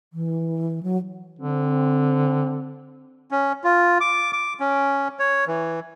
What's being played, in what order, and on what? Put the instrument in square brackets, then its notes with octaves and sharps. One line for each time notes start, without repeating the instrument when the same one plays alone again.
[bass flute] E3
F#3
[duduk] D3 [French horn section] C4
[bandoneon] C#4
F4
D6
D6
C#4
C#5
E3